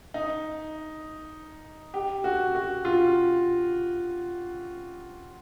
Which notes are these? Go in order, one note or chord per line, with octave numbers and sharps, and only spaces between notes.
D#4
G4
F#4
F#4
F4